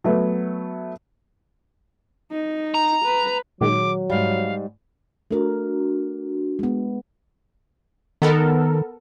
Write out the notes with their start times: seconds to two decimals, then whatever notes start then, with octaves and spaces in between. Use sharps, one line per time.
0.04 F#3 A3 B3
2.32 D#4
2.74 A#5
3.04 B4
3.61 A#2 D#3 F#3 G#3 D6
4.10 G#2 G3 F5
5.31 A3 D4 F#4 A#4
6.59 G#3 B3
8.22 D#3 B3 A4 A#4